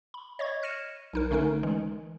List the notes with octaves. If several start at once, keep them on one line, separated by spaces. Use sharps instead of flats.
B5
C#5 D#5 C#6 G#6
F6 A#6 C#7 D#7 E7
B1 D#4 A#4
D3 A3 C#4 D#4 A#4
E3 G#3